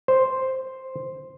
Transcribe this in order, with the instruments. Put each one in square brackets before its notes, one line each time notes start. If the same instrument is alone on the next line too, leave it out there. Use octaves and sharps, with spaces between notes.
[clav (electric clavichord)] C5